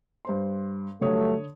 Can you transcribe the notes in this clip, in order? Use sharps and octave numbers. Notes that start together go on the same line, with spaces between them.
G2 C5 C6
G2 D3 F#3 A3 C#5 D#6